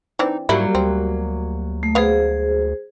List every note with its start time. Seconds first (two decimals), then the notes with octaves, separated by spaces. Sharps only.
0.19 E3 C4 D4 D#4
0.49 G#2 F#3 G3 A#3 E4
0.75 D2 C4
1.83 A3
1.95 B3 G#4 C5 F5